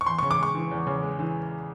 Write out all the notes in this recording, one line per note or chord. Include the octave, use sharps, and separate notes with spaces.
C#6
E2 C6
C#3 C#6
D6
G#3 C#6
E3
E2
C#3
G#3
E3